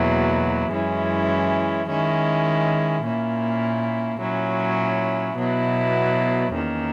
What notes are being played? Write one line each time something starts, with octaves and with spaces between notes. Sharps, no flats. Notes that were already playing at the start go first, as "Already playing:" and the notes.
Already playing: E2 B2 F#3 A#3 E4
F#2 E3 G#3 C#4 E4
D#3 G#3 C#4 E4
A#2 A#3 C#4 E4
A#2 F#3 C#4 E4
B2 F#3 B3 E4
E2 D#3 A#3 C#4